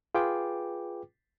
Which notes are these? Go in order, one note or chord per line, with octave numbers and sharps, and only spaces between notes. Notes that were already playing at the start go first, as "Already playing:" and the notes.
F4 G#4 B4 G5 D6